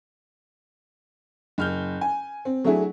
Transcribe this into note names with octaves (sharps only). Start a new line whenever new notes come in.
F#1 F6 G6
G#5
C4
F#3 A3 D4 E4 G#4